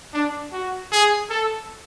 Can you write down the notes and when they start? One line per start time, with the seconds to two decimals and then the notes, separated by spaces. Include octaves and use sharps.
0.14 D4
0.52 F#4
0.92 G#4
1.30 A4